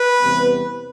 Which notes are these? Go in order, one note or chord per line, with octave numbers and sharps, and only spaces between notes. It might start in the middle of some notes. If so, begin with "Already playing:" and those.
Already playing: B4
E2 C3 G3 B3